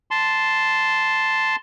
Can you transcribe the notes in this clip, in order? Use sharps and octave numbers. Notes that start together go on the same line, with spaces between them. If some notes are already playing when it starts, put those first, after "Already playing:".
A5 C6